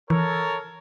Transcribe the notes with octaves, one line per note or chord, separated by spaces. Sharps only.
E3 A4 A#4 C#5